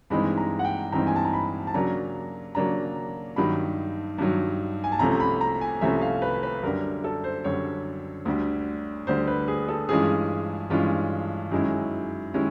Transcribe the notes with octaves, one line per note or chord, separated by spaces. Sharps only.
G2 E3 G#3 C4 D#4 B5
A#5
F#5
G5
G2 E3 G#3 C4 D#4 A#5
G#5
A5
A#5
B5
A5
C#3 F#3 A#3 D4 A#5
C#3 F#3 A#3 D4 A#5
G2 D#3 F#3 B5
G2 D#3 F#3
G#5
A5
C2 C3 F3 A3 C#4 A#5
B5
A#5
G#5
C2 C3 F3 A3 C#4 E5
F5
B4
B4
F#2 D3 G3 A#4
A4
C5
F#2 D3 G3 C#5
D2 D3 G3
D2 D3 G3 C5
B4
G#4
A4
G2 E3 G#3 C#4 F4 G#4
G2 E3 G#3 C#4 F4
F#2 D#3 G#3 C#4 E4
D#3 G#3 C#4 E4